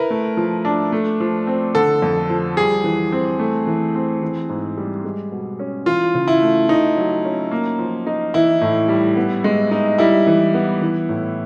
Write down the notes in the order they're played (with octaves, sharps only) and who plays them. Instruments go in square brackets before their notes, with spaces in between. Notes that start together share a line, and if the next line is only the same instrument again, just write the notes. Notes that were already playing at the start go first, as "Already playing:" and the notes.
Already playing: [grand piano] E4 A#4 B4
[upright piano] A3
F3
D4
A3
F3
C4
[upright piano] D3 [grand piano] A4
[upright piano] F2
F3
[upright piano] G3 [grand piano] G#4
[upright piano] E3
C4
A3
E3
C4
E3
G#2
G3
G#3
B2
C#4
[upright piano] E3 [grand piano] F4
[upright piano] C#3
[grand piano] E4
[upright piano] A3
[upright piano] A3 [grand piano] D#4
[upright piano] F#3
C#4
A#3
F3
D#4
[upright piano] E3 [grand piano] E4
[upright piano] A2
G3
B3
G#3
D#4
[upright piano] G3 [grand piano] E4
[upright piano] E3
B3
E3
A2